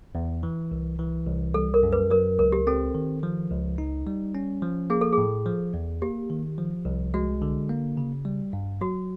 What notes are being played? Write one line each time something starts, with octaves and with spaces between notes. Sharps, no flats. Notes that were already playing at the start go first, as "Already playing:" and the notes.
E2
E3
C2
E3
C2
G3 A4
A#4
F#2
B4
F#3 A#4
C#2 A#4
G4
C4 A4
D#3
F3
C#2
D#4
G3
C#4
F3
A#3 G#4
A4
G#4
A2
F3
E2
A#3 G4
D#3
F3
C2
G#3 F#4
D3
A#3
C#3
G3
G2
F#3 F#4